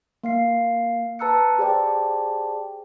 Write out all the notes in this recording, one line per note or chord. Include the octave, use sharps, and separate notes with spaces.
A#3 F5 C7
B4 A5 A#5 E6 F#6 C#7
G4 G#4 C5 D5 G5 A5